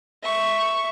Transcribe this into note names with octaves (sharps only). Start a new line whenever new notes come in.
E5 C#6